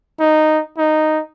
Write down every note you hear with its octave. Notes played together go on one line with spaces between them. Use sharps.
D#4
D#4